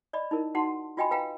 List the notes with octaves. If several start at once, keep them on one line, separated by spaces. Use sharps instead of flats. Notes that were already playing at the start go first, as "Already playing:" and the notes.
D5 D#5 B5
D#4 E4 A#4
D#4 F#4 F#5 A5 C6
F4 F#4 D#5 G5 G#5 B5
B4 F5 G5 A#5